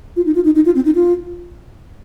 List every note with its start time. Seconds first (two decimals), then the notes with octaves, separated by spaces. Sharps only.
0.16 F4
0.26 D#4
0.35 F4
0.45 D#4
0.55 D#4
0.66 F4
0.75 C4
0.85 D#4
0.95 F4